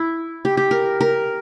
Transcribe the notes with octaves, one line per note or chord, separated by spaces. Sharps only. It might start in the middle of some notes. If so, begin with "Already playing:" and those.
Already playing: E4
G4
G4
A#4
A#4